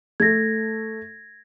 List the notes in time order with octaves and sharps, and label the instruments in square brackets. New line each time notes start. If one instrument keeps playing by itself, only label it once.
[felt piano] A3 A4 [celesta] G#6 A#6